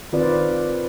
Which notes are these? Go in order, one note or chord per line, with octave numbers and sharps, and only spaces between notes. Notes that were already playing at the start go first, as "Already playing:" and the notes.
D#3 C4 F4 B4 D5